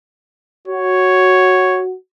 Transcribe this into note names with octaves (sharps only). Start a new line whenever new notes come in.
F#4 C#5